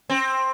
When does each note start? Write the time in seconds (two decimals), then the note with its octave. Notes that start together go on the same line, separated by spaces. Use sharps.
0.10 C4